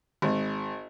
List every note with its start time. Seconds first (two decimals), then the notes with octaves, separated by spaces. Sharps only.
0.22 G#1